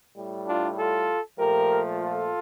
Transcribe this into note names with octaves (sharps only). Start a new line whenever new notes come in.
A2 G3
D4 F4
F4 A4
A#2 F3 A3 G4 A#4
F4 A4